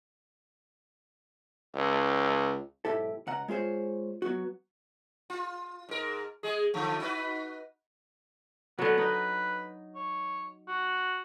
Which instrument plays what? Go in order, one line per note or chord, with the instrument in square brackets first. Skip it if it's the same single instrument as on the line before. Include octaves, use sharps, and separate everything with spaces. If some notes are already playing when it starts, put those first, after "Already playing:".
[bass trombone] C#2
[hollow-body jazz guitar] B1 G#2 E4 G4 A4
C#2 F#5 A#5
G#3 F4 G#4 C5 C#5
F#3 B3 F#4
[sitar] F4
G#2 A#4
G#3 G#4
D3 F3 A3
D#4 F#4 B4
[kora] D3 F#3 [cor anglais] B3
[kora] D#4 [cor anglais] B4
[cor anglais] C#5
F#4